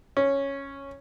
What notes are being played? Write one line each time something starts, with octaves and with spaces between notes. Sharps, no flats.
C#4